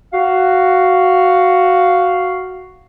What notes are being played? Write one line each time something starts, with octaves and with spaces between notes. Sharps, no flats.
F#4 F5